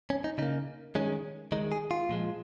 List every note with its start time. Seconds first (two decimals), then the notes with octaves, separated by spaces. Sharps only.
0.10 C#4
0.24 D#4
0.38 C#3 A#3 D#4
0.95 D#3 G#3 C#4
1.52 D#3 G#3 D#4
1.72 G#4
1.91 F4
2.09 A#2 F3 G#3